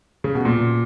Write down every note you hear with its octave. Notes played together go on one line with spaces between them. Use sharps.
C#3
B2
A#2